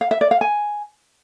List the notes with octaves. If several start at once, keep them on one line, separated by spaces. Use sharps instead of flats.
F5
E5
D5
F5
G#5